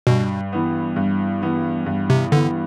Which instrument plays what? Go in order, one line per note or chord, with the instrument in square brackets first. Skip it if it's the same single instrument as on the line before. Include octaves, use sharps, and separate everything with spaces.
[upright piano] G2 [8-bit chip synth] B2
[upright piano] E3 B3
G2
E3 B3
G2
[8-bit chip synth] C3
[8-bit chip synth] D3 [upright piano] E3 B3